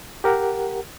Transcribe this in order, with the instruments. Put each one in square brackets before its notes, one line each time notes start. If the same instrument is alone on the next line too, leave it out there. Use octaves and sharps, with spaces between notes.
[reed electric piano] G4 A#4 F#5